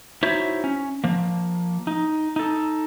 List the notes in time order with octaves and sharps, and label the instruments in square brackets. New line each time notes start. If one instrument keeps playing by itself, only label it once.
[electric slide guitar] D#4 E4 F#4 C5 C#5 E5
C#4
F3 A#3
D#4
D#4 A4